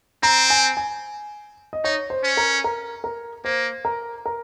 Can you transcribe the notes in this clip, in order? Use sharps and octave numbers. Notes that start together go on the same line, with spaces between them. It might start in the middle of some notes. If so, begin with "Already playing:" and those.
C4 A#5
G#5
G#5
D#5
D#4 C#5
C5
C#4
A#4
A#4
A#4
A#3 C5
A#4
A#4